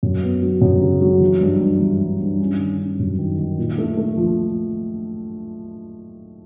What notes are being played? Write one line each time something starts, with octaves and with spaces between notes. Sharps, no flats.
F#2
B3
F#3
F#2
C#3
F#3
E3
G2
G2
E3
G2
G2
C#4
D#3
C#4
F#2
D#3
D#3
A#2
A3
A3
F3